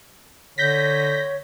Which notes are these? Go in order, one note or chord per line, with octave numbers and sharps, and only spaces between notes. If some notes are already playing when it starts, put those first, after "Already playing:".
D3 C#5 G6 A#6 B6